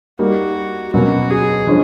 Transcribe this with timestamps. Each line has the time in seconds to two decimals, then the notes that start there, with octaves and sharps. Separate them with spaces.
0.19 G3 A#3 D#4 F#4
0.93 B2 F#3 A#3 C#4 F#4
1.30 G#4
1.67 D3 F3 G#3 C#4